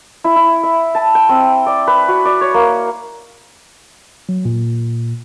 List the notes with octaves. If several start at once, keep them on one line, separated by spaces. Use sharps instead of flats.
E4
E4
E5
A5
G5
C4
D5
B4
F#4
D5
C#5
A#3
F#3
A#2